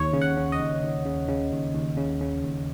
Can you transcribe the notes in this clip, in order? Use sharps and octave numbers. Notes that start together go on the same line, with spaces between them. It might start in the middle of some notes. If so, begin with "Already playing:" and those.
Already playing: D#2 C#5
C#3
F#5
C#3
D#5
D#2
D#2
C#3
C#3
D#2
D#2
C#3
C#3
D#2